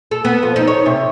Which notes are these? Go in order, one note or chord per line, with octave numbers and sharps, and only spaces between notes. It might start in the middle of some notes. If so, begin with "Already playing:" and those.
A4
B3
F3
D#4
C#5
C3